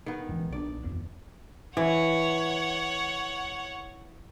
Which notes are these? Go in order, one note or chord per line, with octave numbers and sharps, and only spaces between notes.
D#3 B3
E1 A#1 E3
A#1 D4 D5
D#1 F2
E3 C#5 F#5